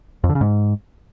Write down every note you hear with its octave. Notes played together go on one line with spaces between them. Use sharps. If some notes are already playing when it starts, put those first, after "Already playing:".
F2
D3
C#3
G#2